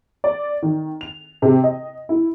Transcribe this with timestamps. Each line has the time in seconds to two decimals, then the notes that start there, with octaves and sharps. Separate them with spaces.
0.24 D5
0.63 D#3
1.01 F7
1.42 C3
1.64 D#5
2.09 E4